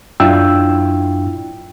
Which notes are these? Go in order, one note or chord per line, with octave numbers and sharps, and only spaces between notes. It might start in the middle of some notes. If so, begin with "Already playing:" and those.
F#2 D4 E4 F4 G5 E6